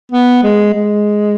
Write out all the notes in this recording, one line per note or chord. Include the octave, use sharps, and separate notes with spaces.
B3
G#3
G#3